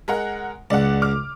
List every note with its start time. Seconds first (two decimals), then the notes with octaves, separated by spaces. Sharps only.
0.08 G#3 A#4 F#5
0.70 C#2 D5 F#5
1.02 D6 F6